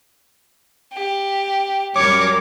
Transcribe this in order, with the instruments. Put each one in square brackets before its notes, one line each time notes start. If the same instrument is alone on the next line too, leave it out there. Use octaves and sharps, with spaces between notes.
[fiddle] G4
[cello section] F#2 G3 A#4 [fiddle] C#5 [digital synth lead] D6